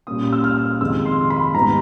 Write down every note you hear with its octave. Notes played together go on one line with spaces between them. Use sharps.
A#2 G3 A#3 C#4 D#6
E6
F6
F2 C3 D#3 G#3 E6
C6
B5
G#2 D#3 G3 B3 A#5